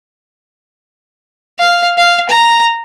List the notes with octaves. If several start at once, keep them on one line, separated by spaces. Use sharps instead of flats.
F5
F5
A#5